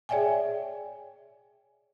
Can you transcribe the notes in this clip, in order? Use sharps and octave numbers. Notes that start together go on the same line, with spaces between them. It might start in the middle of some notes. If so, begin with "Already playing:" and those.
G#4 C#5 D5 E5 G5 G#5